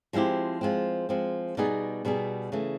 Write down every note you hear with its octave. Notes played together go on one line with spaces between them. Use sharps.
F3 G#3 C4 E4 G4
F3 G#3 C4
F3 G#3 C4
B2 G3 B3 D#4 G#4
B2 G3 B3 D#4 G#4
C#3 E3 A3